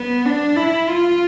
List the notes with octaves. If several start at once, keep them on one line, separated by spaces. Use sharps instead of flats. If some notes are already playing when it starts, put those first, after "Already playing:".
Already playing: B3
D4
E4
F4